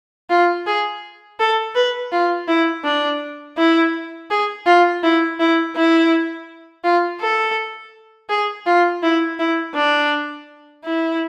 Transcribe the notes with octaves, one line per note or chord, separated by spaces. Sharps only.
F4
G#4
A4
B4
F4
E4
D4
E4
G#4
F4
E4
E4
E4
F4
A4
G#4
F4
E4
E4
D4
E4